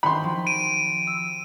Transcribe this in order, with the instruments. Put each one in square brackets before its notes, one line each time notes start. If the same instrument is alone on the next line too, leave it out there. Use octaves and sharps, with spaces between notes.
[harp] D#3 C4 F#4 [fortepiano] B5 C6
[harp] F3
[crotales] D7 D#7
[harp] E6